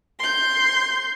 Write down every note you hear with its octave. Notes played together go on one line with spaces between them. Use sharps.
C6 G6